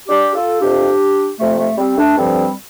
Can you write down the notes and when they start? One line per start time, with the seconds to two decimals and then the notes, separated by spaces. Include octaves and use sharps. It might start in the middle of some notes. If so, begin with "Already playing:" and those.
0.08 D4 G4
0.34 F4 A4
0.60 F2 C3 F3 D4 G4
1.39 F2 C3 F3 A3
1.59 A3
1.78 G3 C4
1.97 A3 D4
2.17 G2 D3 F3 G3 C4